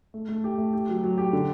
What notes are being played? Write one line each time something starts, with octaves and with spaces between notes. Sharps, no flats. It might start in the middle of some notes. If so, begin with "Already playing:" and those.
A3
A3
G4
A3
G4
F#3
F#3
G4
D3